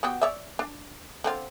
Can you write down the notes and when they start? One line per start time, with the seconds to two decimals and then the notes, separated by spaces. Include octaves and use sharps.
0.03 B3 F#4 G4
0.22 C#5 D5 E5
0.59 D4
1.24 D3 C4 F4